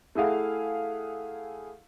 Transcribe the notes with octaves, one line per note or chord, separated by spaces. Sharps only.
A3 E4 G#4 F5 F#5